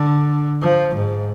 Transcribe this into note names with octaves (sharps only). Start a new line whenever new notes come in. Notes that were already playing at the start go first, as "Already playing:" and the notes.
Already playing: D3
F3
G#2